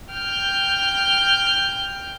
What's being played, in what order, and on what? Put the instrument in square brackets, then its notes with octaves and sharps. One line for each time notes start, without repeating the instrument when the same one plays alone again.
[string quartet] G5 F6 G6